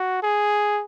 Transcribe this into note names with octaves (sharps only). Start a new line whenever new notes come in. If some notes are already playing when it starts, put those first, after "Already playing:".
Already playing: F#4
G#4